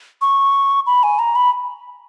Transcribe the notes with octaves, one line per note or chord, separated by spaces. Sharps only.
C#6
B5
G#5
A#5
B5